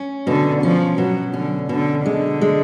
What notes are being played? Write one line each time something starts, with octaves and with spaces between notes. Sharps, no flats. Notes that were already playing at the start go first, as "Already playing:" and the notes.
Already playing: C#4
B2 D3
F3 C#4
B2 F#3
D3 C#4
B2 D3
D3 G#3
G#3